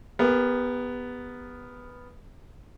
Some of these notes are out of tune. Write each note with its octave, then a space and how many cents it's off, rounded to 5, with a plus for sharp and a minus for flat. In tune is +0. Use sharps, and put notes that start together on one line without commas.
B3 +0 G4 +40 A#4 +0